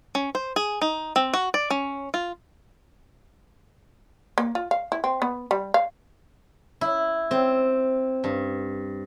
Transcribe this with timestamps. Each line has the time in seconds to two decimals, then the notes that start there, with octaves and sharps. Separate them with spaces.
0.15 C#4
0.35 C5
0.56 G#4
0.82 D#4
1.16 C4
1.34 F#4
1.54 D5
1.70 C#4
2.14 F4
4.38 A#3
4.55 F4
4.71 F5
4.92 E4
5.04 C4
5.22 B3
5.51 G3
5.74 F5
6.81 E4
7.31 C4
8.24 G2